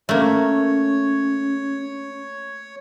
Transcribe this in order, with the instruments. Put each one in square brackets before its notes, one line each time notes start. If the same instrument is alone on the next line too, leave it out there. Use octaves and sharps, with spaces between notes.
[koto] A3 A#3 [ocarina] C#4 [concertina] C#5